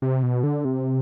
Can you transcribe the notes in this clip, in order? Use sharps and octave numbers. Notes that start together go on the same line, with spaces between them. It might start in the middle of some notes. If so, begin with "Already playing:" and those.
C3
B2
D3
C3